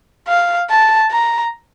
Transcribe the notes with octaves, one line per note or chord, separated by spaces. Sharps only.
F5
A5
A#5